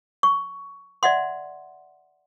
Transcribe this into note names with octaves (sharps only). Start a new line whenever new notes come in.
C#6
D5 E5 F#5 C6